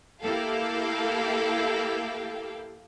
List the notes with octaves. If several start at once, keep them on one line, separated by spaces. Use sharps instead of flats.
A#3 E4 G4 A4 F5 G5